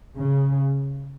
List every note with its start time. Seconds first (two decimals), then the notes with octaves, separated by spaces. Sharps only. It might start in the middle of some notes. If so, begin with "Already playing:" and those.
0.16 C#3